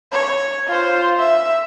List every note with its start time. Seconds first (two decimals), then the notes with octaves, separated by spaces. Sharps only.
0.12 C#5
0.67 F4 C5
1.18 E5